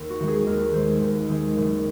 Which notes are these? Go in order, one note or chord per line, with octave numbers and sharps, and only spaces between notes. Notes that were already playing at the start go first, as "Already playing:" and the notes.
Already playing: D#2
F#4
D#3 G#3
G#4
D#2 A#4
D#3 G#3 C5
D#2
D#3 G#3
F#1